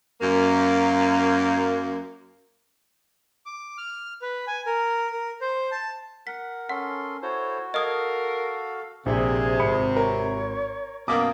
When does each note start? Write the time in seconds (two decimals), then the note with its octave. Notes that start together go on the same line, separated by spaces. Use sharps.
0.21 F#2 A#3
3.46 D6
3.78 F6
4.22 B4
4.47 G#5
4.66 A#4
5.12 A#4
5.41 C5
5.72 A5
6.27 A#4 F#5 B6
6.69 C#4 A4 F#5 C6
7.22 E4 F#4 A4 C5 C#5
7.74 A4 A#4 D#5 F5 D#6 G#6
9.06 A#1 C3 G#4
9.60 G#1 B5 C#7
9.96 A#4 C#5
11.08 F#2 B2 A#3 D6 D#6